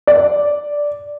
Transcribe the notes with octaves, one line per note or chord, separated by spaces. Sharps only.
D5